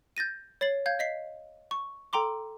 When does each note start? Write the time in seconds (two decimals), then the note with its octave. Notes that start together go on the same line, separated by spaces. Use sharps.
0.17 G6 A6 A#6 D#7
0.61 C#5 A6 C7 F#7
0.86 F5 G6 G#6
0.99 D#5 B6 C7
1.71 C#6
2.13 A4 G5 A#5 C6 D6